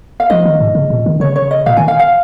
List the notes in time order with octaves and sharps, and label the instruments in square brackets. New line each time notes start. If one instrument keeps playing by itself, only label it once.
[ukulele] F5
[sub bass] F3 [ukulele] D#5
[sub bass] D#3
G#2
C#3
A#2
D#3
[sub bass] C#3 [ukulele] C#5
[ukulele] C#5
D#5
[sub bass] A#2 [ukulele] F5
[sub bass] D#3 [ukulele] G#5
[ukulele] F5
F5